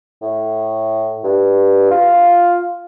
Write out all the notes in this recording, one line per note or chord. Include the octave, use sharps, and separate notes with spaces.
A2
G2
F4